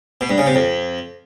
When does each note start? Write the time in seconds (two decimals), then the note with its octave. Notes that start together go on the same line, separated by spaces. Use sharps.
0.21 B2
0.29 G2
0.38 C#3
0.46 C3
0.55 F2